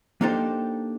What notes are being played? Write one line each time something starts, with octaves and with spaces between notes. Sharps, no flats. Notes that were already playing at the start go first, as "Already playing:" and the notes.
A#3 D4 D#4 G4 A4 C5